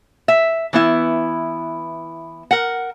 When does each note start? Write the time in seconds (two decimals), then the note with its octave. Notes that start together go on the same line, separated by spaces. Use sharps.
0.28 E5
0.73 E3 B3 E4
2.51 A#4 F#5